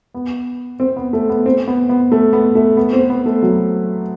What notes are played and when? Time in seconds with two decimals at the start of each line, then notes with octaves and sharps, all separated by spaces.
0.14 B3
0.80 C4
0.96 B3
1.13 A3
1.29 B3
1.46 C4
1.67 B3
1.89 B3
2.12 A3
2.33 B3
2.55 A3
2.77 B3
2.93 C4
3.10 B3
3.26 A3
3.42 F#3